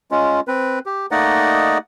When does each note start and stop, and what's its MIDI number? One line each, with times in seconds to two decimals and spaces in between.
0.11 0.40 56
0.11 0.40 61
0.11 0.40 65
0.48 0.79 60
0.48 0.79 71
0.86 1.06 67
1.11 1.78 57
1.11 1.78 58
1.11 1.78 63
1.11 1.78 74
1.11 1.78 75
1.11 1.78 78